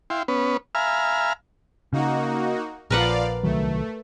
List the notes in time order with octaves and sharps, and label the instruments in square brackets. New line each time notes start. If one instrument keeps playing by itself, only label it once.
[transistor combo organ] E4 F5 G5 C6
B3 C#4 B4
E5 F5 G#5 A#5 B5 F6
[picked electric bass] C#3 [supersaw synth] A#3 D#4 F#4
[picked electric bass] A#1 [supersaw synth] F3 D5 F5 [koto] A#4 B4 F#5
[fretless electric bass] C2 D#3 F#3 [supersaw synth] A3